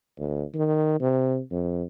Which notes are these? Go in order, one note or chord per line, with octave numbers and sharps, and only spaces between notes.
D2
D#3
C3
F2